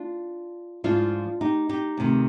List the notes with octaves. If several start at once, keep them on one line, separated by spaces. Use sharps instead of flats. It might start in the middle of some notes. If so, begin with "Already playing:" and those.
Already playing: D4 F4
G#2 F3 D4 F4
D#4 G4
D#4 G4
D2 C3 D#3